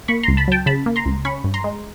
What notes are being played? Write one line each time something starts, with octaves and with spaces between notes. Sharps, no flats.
A#3 B5 C#6
C#2 A#5 C6
A5 B5
F#3 G5 A5
C#3 A5 B5
A#3
A#5 C6
C#2
C#4 B5 C#6
G2
A#5 C6
G#3